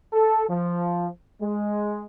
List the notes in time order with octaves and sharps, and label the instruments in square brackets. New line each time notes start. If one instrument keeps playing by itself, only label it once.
[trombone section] A4
F3
G#3